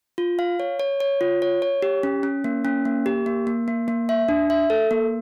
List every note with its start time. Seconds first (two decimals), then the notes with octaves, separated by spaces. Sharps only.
0.18 F4
0.39 F5
0.60 C#5
0.80 C#5
1.00 C#5
1.21 F4
1.42 C#5
1.62 C#5
1.82 G4
2.03 C#4
2.23 C#4
2.44 A#3
2.65 C#4
2.85 A#3
3.06 G4
3.26 A#3
3.47 A#3
3.68 A#3
3.88 A#3
4.09 E5
4.29 D4
4.50 E5
4.70 A4
4.91 A#3